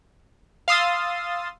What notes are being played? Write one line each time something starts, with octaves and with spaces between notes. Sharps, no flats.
F5 C6 D#6 E6 A6